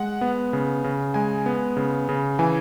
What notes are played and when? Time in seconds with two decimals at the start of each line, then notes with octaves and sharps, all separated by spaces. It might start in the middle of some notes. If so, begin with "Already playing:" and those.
Already playing: G#3 F#5
0.21 B3
0.53 C#3
0.84 C#3
1.14 G#3 G#5
1.46 B3
1.77 C#3
2.09 C#3
2.39 E3 G#5